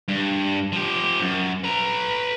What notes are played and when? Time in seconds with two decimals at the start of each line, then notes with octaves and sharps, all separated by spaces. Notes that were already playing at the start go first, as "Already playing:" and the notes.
0.08 G2
0.72 F3 G4
1.21 F#2
1.64 B4 A#5